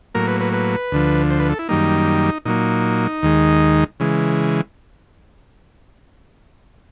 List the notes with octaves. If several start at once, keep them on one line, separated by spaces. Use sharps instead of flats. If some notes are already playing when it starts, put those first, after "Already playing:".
A2 F#3 A#3 A#4
B4
B4
B4
D2 D3 F3
C5
B4
A4
E4
F#2 D#3 G3 A#3 D#4
A#2 F#3 A#3 D#4
D#2 D#3 G#3
C#3 E3 G#3